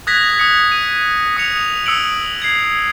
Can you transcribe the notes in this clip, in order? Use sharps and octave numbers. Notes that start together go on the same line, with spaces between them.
D#6 F#6 G#6 A#6 B6
D#6 C#7
D#7
D#6 C#7 F7
D#6 E6 C#7 D7 F#7
G#6 C7